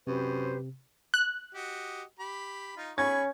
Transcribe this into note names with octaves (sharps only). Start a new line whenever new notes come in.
F#2 C3 G4 B4 C5
F#6
F#4 G4 D#5
G4 B5
D#4 F4
C#4 G#4 B5 C#6 G#6